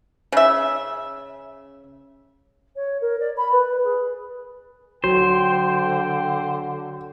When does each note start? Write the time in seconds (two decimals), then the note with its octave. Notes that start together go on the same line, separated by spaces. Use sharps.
0.32 C#3 E5
2.75 C#5
3.01 A#4
3.19 D5
3.37 B5
3.52 B4
3.83 G#4
5.04 D3 F#3 C5 G5